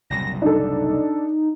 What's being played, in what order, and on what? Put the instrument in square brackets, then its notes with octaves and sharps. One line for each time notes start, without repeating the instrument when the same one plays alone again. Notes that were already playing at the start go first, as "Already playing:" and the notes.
[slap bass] F#1 C2 A#2 [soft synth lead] A#6
[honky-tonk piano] D4 A4 [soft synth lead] D#4